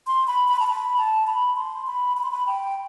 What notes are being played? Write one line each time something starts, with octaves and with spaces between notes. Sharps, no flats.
C6
B5
B5
A5
B5
A5
B5
C6
B5
B5
C6
B5
G5